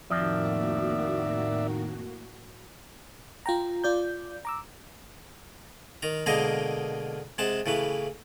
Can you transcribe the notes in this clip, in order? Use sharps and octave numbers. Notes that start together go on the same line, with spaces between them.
F2 A2 D#3 F3 A#3 F#4 D5 E5
F4 G5 A#5
F4 D5 G6
A#5 D6 E6
D#3 A#5
B2 D3 G#3 A#3 A#4 D#5
C3 G#3 F#5 A5
A2 C#3 E3 B4